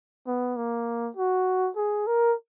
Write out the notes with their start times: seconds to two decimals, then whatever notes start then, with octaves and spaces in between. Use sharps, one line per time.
0.27 B3
0.56 A#3
1.16 F#4
1.76 G#4
2.07 A#4